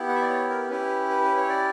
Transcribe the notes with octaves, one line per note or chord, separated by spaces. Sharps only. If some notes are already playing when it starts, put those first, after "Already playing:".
Already playing: B3 E4 G4
F#5
E5
D5
C#5
A#4
C#4 E4 G4 B4
B4
B4
C#5
D5